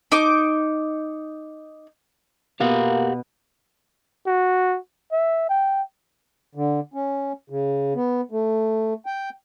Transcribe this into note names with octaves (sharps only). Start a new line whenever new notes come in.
D#4 D6
B2 A#3 G4 F5 F#5
F#4
E5
G5
D3
C#4
C#3
B3
A3
G5